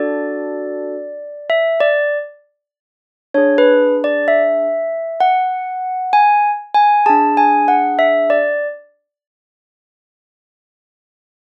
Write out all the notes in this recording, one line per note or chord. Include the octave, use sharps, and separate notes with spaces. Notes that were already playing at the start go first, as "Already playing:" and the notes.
Already playing: D4 F#4 A4 D5
E5
D5
D4 G#4 C#5
B4
D5
E5
F#5
G#5
G#5
D4 G#4 A5
G#5
F#5
E5
D5